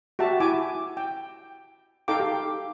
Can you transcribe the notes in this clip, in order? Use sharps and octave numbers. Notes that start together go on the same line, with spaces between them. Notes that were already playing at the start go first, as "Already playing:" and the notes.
F#4 G4 E5 A5
E4 G#5 D6
G5
D#4 A4 F5 G5 D6
G4 F5